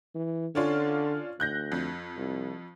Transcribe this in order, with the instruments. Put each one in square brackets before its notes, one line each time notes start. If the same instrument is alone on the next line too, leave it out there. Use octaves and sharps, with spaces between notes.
[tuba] E3
[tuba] D3 [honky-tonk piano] C#4 D4 F4
[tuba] D2 [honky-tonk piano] F#6 G6 A#6
[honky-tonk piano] F2
[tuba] C2